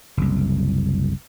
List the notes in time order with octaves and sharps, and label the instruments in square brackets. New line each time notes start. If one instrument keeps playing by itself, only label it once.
[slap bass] F#1 C2